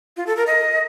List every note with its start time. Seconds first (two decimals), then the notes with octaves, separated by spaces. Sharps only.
0.17 F4
0.27 A4
0.37 A#4
0.47 D#5